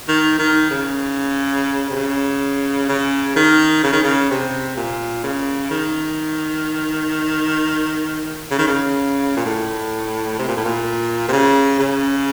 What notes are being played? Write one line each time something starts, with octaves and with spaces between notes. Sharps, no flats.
D#3
D#3
C#3
C3
C#3
C#3
D#3
C#3
D#3
C#3
C3
A#2
C#3
D#3
C#3
D#3
C#3
A#2
A2
C3
A#2
A2
A#2
C3
C#3
C#3